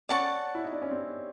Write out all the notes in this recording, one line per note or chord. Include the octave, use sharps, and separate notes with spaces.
C#4 D5 F#5 A5 C#6
E4
D#4
D4
C#4
C4